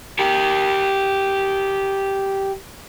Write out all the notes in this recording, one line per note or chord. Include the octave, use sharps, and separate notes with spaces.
G4 A#4